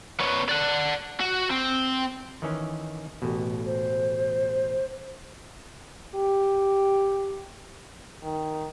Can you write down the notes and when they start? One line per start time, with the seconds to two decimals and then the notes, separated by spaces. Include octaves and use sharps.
0.20 B3 C#4
0.49 D5 F#5
1.20 F#4
1.51 C4
2.42 D#3 E3 C#4
3.22 A1 B2
3.66 C5
6.14 G4
8.23 D#3